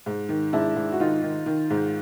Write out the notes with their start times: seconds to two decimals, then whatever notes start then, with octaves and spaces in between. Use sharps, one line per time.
0.06 G#2
0.29 D#3
0.53 G#2 D4 E4
0.76 G#2
0.92 F#4
1.00 D#3 D#4 F4
1.22 D#3
1.46 D#3
1.70 G#2